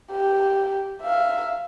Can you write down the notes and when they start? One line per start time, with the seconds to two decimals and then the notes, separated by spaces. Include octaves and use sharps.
0.11 G4
1.02 E5 F5